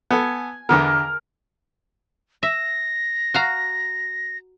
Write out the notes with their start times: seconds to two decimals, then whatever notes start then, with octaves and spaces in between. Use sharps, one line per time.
0.11 B3 A4 G#5
0.69 E2 D3 B3 A#4
2.43 E5 A#6
3.34 F#4 F5 A#5